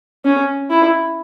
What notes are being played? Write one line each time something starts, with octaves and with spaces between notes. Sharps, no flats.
C#4
E4